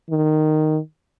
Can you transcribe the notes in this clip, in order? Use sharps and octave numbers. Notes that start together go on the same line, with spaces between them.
D#3